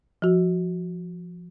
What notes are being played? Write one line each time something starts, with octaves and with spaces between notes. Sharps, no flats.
F3 F#4